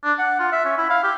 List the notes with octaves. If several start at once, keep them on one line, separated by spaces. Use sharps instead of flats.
D4
F#5
F4
E5
C#4
E4
F5
G4